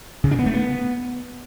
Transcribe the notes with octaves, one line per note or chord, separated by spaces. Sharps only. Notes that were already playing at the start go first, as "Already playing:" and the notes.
C#3
D4
B3
A3
B3